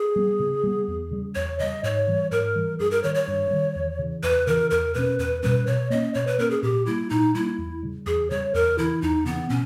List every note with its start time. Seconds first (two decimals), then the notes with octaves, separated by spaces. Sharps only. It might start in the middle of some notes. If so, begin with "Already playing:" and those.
Already playing: G#4
0.16 G3 B3
0.39 C#3
0.64 G3 B3
0.88 E2
1.11 C#3 G3
1.35 E2 C#5
1.59 C#3 G3 D#5
1.83 G#2 C#5
2.07 E3 G3
2.31 G#2 A#4
2.56 E3 G3
2.79 G2 G#4
2.91 A#4
3.03 D#3 G3 C#5
3.15 C#5
3.28 G2
3.51 D#3 G3
3.76 E2
3.99 C#3 E3
4.23 E2 B4
4.47 C#3 E3 A#4
4.70 E2 A#4
4.94 B2 G3 C#4 B4
5.18 E2 B4
5.43 B2 G3 C#4 B4
5.67 B2 C#5
5.90 A#3 C#4 D#5
6.14 B2 C#5
6.27 B4
6.38 A#3 C#4 A#4
6.51 G#4
6.63 A#2 G4
6.86 G3 A#3 E4
7.10 A#2 D#4
7.35 G3 A#3 E4
7.58 E2
7.83 C#3 G3
8.06 E2 G#4
8.30 C#3 G3 C#5
8.54 E2 A#4
8.78 C#3 E3 E4
9.02 E2 D#4
9.26 C#3 E3 B3
9.50 B2 C#4